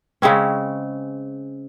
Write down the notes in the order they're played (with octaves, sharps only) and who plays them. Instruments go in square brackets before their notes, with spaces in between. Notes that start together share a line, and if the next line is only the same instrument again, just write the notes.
[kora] C#3 G#3 C4 C#4